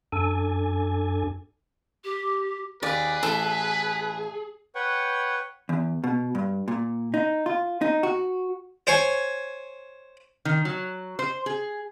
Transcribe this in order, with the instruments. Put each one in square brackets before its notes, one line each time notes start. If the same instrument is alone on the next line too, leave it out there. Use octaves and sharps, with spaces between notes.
[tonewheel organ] F#2 D4 A4 G#5
[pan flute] G4
[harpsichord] D#2 [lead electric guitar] G#4 [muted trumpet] B4 [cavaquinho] D5
[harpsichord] A1 E4 C5 [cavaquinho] A4
[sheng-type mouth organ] B4 C#5 F#5 G5 C#6
[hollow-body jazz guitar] E2
B2
G2
A#2
D#4
F4
D#4
F#4
[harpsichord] C5 C#5 G#5
[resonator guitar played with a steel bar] D#3
F#3
C5
G#4